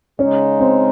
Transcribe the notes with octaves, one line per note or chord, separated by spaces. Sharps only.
C#3 G#3 C#4 D#4
C4